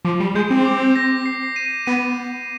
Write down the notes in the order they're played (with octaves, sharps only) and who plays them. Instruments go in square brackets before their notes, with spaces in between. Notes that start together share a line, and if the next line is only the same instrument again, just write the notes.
[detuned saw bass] F3 [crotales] D6
[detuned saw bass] G3
[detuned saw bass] G#3 [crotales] G6
[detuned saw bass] C4
[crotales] D6
A#6
C7
D#7
[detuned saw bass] B3 [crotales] D#7